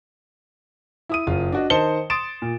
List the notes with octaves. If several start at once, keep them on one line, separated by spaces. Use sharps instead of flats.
E4 D#6 D#7
F#1 F4
D4 F#4 D#5
D#3 C5 D#5 A5 C#7 G7
C6 D#6 A6 D7 E7
A#2